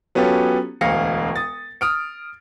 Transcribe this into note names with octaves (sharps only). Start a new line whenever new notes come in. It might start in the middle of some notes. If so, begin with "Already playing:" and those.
F#3 B3 C#4 F4 G4 A4
E1 D2 F5 A#6 C#7
D#6 A6
D#6 F6 D7